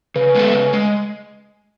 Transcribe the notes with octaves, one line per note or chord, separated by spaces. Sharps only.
C#3 B4
G#3 B3 F#4 A4
C#3
G#3